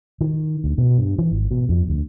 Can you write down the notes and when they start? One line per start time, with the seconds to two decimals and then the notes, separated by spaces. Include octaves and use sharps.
0.21 D#3
0.64 D2
0.78 B2
0.98 G2
1.18 E3
1.31 G#1
1.51 B2
1.69 F2
1.89 D2